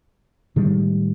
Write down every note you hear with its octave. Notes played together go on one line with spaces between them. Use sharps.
A2 D#3 G3 G#3